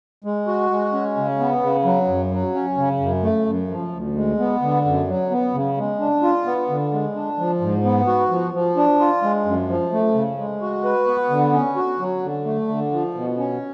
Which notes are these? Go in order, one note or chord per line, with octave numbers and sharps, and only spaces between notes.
G#3
F#4
G#3
C#4
C#3
B3
C#3
F#3
F#2
F#3
C#4
C#3
F#2
A3
F#2
F3
D2
G#3
B3
D3
F#2
F#3
B3
C#3
G#3
D4
F4
B3
D3
G#3
D4
F3
G#2
B3
F#4
F3
F3
D4
F4
G#3
F#2
F3
A3
C#3
G#3
F#4
B4
B3
D3
C#4
F#4
F#3
D3
A3
D3
F3
B2
C#4